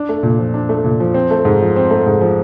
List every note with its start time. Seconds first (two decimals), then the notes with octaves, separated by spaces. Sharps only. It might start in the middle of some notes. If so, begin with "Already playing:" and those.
Already playing: D4
0.09 A3
0.23 A#2
0.39 F3
0.54 D4
0.69 A3
0.84 A#2
1.00 F3
1.14 C4
1.31 A3
1.45 G#2
1.61 F3
1.76 C4
1.90 A3
2.06 G#2
2.21 F3